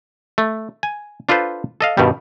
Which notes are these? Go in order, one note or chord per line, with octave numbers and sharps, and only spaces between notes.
A3
G#5
D4 F4 A4 B4 C5
A4 D#5 F5
G2 B2 D#3 G3